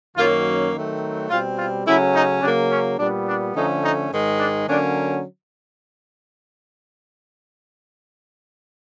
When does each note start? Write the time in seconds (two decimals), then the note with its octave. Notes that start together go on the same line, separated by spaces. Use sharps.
0.16 F#2 D#3 F#3 A#3 C#4 F4
0.72 D#3 F#3 A3 C4
1.29 B2 G3 C4 F4
1.57 F4
1.86 C#3 F#3 A3 C#4 E4
2.14 D#4
2.42 C#3 F#3 A#3 D4
2.70 C#4
2.98 A#2 G3 B3 D4
3.26 D4
3.55 D3 F3 A3 C#4 D#4
3.83 D#4
4.12 G#2 D#3 G#3
4.39 D4
4.67 D3 F#3 A#3 C#4 D4